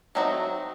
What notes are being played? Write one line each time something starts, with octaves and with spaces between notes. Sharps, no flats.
F#3 A3 C4 D#4 F#4